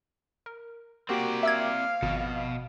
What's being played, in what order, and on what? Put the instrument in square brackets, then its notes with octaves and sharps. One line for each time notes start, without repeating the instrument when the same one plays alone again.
[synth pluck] A#4
[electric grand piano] A#3 F#4 G4 [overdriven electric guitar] C4 D5
[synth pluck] E5 E6 G#6 [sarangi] F5
[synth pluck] G#1 [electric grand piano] F2 [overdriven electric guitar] B2